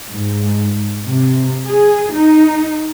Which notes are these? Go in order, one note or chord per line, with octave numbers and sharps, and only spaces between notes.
G#2
C3
G#4
D#4